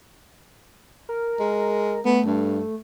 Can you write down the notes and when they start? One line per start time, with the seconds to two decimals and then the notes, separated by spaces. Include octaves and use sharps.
1.09 A#4
1.40 G#3
2.05 A3 B3
2.26 G2